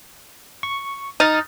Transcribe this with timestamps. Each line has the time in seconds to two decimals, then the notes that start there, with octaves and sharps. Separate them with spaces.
0.63 C#6
1.20 D#4 D#6 F6 A6